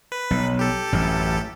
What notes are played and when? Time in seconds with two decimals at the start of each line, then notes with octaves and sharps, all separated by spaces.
0.12 B4
0.30 B1
0.59 G4 A4
0.92 A1 F#2